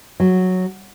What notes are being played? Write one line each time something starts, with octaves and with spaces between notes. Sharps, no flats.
F#3